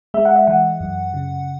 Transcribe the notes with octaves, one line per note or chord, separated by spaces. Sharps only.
G#3 E5
F#5
E5
E3 F#5
F#2
C#3